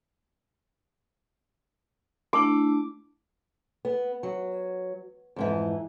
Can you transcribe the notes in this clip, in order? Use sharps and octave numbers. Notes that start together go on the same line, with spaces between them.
A3 D4 E4 D6
B3
F#3
F2 G#2 E3